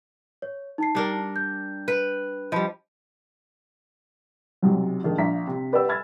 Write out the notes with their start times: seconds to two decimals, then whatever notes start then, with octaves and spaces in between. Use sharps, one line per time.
0.42 C#5
0.78 D#4 A5 C7
0.95 G3 D4 A#4
1.36 G6
1.88 B4
2.52 F3 G3 D#5 B5
4.62 B1 C3 F#3
5.04 A#1 D#3 G#3 A3
5.18 A#1 E5 F5 A#5 B6
5.47 C3
5.72 G4 B4 D5 F#5 G5 E6
5.88 E5 G#5 B5 F6 G#6 A6